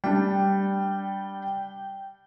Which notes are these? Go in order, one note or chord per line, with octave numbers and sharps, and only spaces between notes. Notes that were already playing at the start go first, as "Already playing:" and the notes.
G3 D4 G5